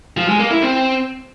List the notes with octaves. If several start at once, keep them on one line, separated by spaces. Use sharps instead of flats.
F3
G#3
A#3
E4
C4